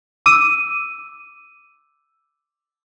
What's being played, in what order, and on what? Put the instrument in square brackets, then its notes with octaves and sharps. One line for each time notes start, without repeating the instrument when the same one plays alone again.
[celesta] D6 E6 D#7